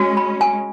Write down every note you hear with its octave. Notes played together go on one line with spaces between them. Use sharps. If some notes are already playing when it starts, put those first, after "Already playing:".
Already playing: G#3 C#4 F#4
B5
G#5